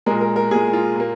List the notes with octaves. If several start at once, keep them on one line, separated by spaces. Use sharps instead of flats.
A#2 G#3 A#4
A#4
A#4
A#2 G#3 G#4
F4
A#2 A#3